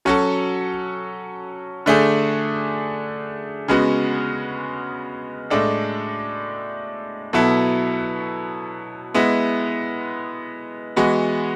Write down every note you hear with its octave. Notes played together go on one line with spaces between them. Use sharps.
F#3 C#4 F#4 A4
D3 A3 D4 G#4
C#3 G#3 B3 F#4
A2 G#3 D4 A4
B2 F#3 B3 E4 A4
G#3 B3 E4
E3 G#3 B3 F#4